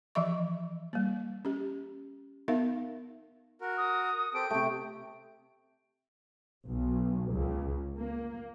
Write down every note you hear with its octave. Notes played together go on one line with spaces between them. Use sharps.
E3 F3 D#5 E5 C#6
G3 A#3
C#4 G4
B3 D#4 A#4 E5 F5
F#4 A#4
D#6
C4 G4 A4 D7
C3 A3 G5
B1
C#2
A#3